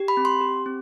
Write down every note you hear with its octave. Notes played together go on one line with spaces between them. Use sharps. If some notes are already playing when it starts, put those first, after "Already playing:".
Already playing: G4
B5
C4
C6
G4
C4